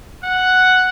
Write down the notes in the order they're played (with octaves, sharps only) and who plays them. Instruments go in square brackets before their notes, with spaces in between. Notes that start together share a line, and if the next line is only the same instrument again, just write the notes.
[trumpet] F#5